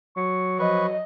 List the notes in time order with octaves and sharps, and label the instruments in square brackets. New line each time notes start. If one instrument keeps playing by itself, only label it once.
[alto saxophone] F#3 [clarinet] C#6
[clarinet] F3 [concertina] B4 C#6 [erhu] D#5